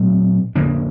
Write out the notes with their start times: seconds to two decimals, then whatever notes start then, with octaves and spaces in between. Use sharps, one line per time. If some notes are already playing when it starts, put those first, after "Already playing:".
Already playing: A#2 F#3 A3 C4
0.56 C#3 F3 A#3 D4